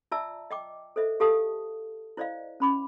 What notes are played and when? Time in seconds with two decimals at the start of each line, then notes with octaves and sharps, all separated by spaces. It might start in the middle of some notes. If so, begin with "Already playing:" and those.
0.12 F4 D5 E5 A5 A#5 E6
0.51 D#5 G5 D6
0.96 A4 C5 D#5 E5
1.20 G4 A4 F5 A5 D#6
2.17 E4 C5 D5 D#5 F5
2.60 C#4 B5 D6